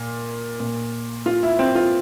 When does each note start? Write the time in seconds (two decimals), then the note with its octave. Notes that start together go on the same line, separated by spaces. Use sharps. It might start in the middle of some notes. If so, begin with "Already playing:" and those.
Already playing: A#2
0.60 A#2
1.26 F4
1.43 E4
1.59 C4
1.75 F4